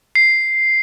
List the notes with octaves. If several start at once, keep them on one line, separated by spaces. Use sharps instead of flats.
C7